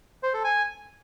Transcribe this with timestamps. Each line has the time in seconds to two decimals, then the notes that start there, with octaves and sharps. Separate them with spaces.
0.23 C5
0.34 A4
0.44 G#5